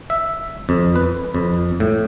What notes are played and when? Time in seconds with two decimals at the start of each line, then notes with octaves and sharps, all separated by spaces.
0.10 E5
0.69 F2
0.96 B4
1.34 F2
1.80 A2